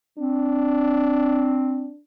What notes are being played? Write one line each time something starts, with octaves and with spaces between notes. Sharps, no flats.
C4 D4